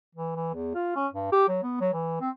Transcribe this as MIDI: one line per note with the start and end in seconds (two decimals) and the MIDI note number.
0.15 0.34 52
0.36 0.54 52
0.54 0.74 40
0.75 0.95 65
0.96 1.07 61
1.13 1.29 43
1.32 1.48 67
1.48 1.58 54
1.63 1.76 59
1.81 1.89 54
1.93 2.18 52
2.21 2.30 60